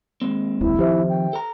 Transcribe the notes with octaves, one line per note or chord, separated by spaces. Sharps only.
D#2 G#3 C4
D1 A#1 E2 E4
D#3 F3 C4 G4 C5 E5
G5
A4 A#5